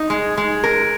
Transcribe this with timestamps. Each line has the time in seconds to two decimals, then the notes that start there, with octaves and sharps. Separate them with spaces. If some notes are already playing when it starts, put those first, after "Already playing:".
Already playing: D#4
0.10 G#3
0.37 G#3
0.64 A#4